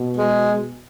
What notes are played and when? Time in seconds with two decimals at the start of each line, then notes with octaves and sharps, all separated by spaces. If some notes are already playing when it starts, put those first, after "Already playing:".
Already playing: B2
0.17 G#3